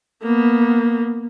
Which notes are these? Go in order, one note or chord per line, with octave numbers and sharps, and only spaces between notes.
A#3 B3